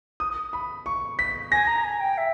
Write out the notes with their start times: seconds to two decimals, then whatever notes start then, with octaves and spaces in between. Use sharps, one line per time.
0.20 D#6
0.53 B5
0.86 C#6
1.19 B6
1.52 G#5 A#6
1.67 A#5
1.84 G#5
2.00 G5
2.18 E5